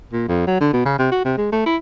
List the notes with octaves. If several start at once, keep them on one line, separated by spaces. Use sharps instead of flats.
A#2
F2
F#3
D3
B2
C#3
C3
F#4
C3
G#3
A3
E4